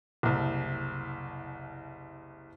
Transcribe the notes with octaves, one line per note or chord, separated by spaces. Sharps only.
F#1 C2